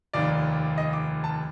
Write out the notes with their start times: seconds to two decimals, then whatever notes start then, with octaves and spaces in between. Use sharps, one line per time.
0.13 F1 D#2 D#3 D5
0.78 D#5
0.93 D6
1.24 A5